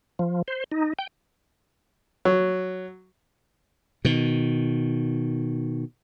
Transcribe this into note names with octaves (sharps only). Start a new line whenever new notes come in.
F3
C5
D#4
G5
F#3
B2 D#3